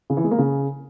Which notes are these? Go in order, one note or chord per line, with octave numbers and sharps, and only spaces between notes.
C#3
E3
G#3
A#3
C#3